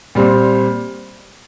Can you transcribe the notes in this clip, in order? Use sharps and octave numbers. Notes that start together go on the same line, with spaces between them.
A#2 G3 C4